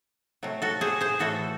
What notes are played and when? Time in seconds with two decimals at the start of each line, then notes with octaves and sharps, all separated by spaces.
0.43 C3 F#3 A3
0.62 F#4 A4
0.81 G#4 C5
1.01 G#4 C5
1.19 A2 E3 A3 F#4 A4